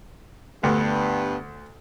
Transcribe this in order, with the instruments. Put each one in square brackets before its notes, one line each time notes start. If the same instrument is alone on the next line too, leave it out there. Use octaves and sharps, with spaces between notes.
[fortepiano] D2 [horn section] G2 B3